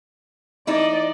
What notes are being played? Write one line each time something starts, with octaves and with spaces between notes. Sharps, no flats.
E3 D#4 E4 D5 D#5